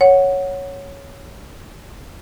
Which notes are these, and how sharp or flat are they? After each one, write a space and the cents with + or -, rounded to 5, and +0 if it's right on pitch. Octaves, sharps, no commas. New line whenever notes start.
C#5 +0 F#5 -5